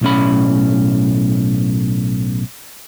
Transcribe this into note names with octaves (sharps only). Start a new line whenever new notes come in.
B1 A2 C#4 B5